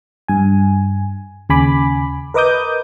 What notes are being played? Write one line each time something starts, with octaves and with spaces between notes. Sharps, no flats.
G2 G#5
D#2 C#3 G#5 B5 D6
A#4 B4 D#5 D6 D#6 G6